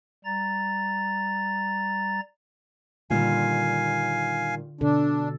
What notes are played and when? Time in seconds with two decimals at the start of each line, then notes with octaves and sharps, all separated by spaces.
0.24 G3 A#5 A6
3.10 A#2 D3 D#3 G3 F4 F5 G#5
4.81 B2 D3 D4 A4